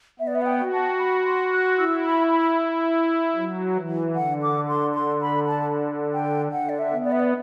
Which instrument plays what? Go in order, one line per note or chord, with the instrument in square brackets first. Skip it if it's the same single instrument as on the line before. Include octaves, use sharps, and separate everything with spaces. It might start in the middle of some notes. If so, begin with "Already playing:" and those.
[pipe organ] B3 [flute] E5
[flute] D5
E5
F#5
G5
[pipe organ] F#4
[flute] A5
B5
C6
F#6
[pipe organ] E4 [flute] E6
[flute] B5
B5
[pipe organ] F#3
E3
[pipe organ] D3 [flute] F#5
[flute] D6
C6
C6
B5
A5
G5
[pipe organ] D3 [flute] F#5
[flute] D5
E5
[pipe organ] B3
[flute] D5
E5
D5